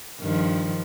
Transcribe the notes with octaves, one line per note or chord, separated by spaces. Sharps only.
G2 D#3 F3